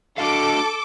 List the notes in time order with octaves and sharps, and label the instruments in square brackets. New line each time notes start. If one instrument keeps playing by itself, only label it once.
[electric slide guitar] D4 F#4 F5 [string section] A4 D6